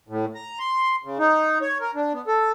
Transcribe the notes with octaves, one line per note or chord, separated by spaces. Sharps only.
A2
A#5
C6
C#3
D#4
C#5
A#4
D4
B3
A4